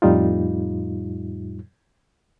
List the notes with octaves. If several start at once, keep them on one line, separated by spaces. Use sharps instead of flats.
F2 A2 G3 D#4 F4